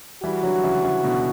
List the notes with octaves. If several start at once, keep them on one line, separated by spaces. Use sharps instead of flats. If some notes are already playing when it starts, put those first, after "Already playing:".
E3 G3 F#4
D3 F#3
C#3 E3
C#3 E3
B2 D3